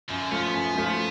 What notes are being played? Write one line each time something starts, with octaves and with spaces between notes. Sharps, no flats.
F#2 F3
D3
F3 A3 C#4 F4
B3
F#2
F3 A3 F4